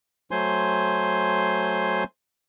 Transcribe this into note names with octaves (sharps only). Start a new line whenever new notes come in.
F#3 A3 C5 G#5 C6